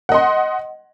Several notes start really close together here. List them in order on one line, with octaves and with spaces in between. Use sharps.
F#5 D#5 C6